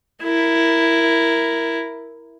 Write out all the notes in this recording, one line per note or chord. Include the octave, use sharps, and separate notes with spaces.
E4 A#4